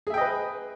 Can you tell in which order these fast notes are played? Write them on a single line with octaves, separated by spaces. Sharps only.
G#4 E5 G5 D#5 B4